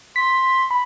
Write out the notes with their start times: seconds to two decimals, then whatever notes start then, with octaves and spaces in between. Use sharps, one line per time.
0.16 C6 B6
0.71 B5